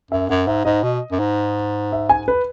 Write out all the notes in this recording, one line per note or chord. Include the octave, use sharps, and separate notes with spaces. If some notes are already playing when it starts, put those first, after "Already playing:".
F#2 E5
F#2 F#5
G#2 E5
G#2 D#5
B2
F#2
G#2
E5
G#5
B4